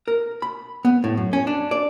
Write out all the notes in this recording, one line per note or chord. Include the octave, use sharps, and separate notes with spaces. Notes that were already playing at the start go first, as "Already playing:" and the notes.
A#4
B5
B3
A2
F#2
C#4
D4
D5